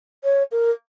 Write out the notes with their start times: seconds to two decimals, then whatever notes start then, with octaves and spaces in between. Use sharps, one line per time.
0.24 C#5
0.52 A#4